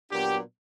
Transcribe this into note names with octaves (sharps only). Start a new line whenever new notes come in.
A#2 F#3 B3 D4 G4